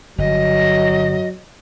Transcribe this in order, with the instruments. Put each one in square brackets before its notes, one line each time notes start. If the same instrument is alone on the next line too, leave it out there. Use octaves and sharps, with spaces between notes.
[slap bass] G1 [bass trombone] F#3 [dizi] D#5